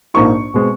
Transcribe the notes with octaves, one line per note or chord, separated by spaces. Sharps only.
A#1 G#2 F3 A#3 D#4 C#6
B2 G#3 C4